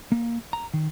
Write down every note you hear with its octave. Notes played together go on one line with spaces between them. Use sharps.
A#3
A#5
D#3